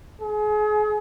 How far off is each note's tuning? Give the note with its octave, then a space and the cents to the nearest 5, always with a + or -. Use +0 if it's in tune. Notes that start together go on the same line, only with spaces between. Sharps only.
G#4 +35